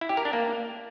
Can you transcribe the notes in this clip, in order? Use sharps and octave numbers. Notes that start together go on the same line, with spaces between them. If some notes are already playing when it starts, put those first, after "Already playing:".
E4
G4
A#4
D4
A#3